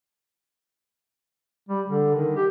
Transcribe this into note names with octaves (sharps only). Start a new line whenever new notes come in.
G3
D3
D#3
G4